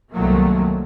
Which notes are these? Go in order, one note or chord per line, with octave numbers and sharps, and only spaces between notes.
C2 F#2 D#3 F#3 A3 A#3